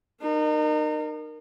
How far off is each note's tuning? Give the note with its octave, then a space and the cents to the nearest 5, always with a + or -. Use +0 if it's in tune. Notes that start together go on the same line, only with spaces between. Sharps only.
D#4 -35 A#4 +0